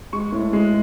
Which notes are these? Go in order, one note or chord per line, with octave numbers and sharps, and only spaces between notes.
G#3 C#6
A2
G#3